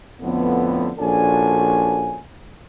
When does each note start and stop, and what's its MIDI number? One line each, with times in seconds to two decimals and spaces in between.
0.22 0.91 41
0.22 0.91 45
0.22 0.91 50
0.22 0.91 59
0.99 2.19 34
0.99 2.19 61
0.99 2.19 62
0.99 2.19 66
0.99 2.19 69
0.99 2.19 80